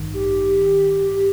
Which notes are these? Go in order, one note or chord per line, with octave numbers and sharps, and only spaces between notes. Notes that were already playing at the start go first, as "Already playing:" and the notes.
Already playing: A1 G2 D#3
G4